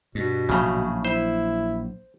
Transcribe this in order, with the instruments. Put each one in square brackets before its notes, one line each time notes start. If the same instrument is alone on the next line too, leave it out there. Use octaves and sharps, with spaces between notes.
[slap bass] G2 [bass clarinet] B2
[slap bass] A#1 F#3 [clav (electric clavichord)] A2 C#3
[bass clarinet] E4 [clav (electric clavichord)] C5